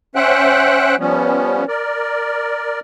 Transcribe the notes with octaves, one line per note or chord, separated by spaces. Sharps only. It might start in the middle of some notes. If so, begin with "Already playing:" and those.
C#4 C5 E5 F#5 G5 F#6
F3 G3 B3 C#4
A#4 D5